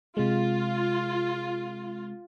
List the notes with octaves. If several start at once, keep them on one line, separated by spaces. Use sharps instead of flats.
C3 G#3 F4